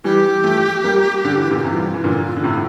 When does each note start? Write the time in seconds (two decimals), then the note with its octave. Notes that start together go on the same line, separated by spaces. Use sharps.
0.04 E3 G3 G4
0.44 F3 A3
0.84 G3 A#3
1.25 D3
1.37 E3
1.50 A#2 D3
1.59 G4
1.64 C3 E3 F4
1.74 G3
1.85 F3
1.94 E3
2.04 A#2 D3
2.37 D3
2.44 A2 C3